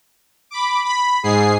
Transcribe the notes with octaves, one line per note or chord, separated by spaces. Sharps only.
B5 D6
B5
G#2 G#4 C7